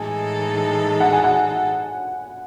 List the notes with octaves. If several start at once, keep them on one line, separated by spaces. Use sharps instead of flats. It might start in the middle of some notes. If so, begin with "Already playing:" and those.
Already playing: A2 E3 G#3 D#4 A4 G#5
F#5
G#5
F#5